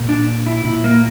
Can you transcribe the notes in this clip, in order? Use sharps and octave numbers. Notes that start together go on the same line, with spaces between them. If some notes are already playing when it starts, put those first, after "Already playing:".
Already playing: A#2
D4
E4
A#2 E4
A#3